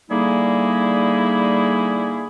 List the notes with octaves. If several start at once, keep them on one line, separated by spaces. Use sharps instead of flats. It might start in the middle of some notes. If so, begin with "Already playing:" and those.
D3 G3 A#3 D#4 E4 G#4